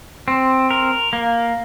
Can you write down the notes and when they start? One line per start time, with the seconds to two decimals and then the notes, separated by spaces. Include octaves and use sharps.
0.28 C4
0.71 A#4
1.13 A#3